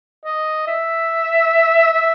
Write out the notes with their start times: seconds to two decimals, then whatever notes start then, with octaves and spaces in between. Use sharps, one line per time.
0.25 D#5
0.67 E5
1.93 E5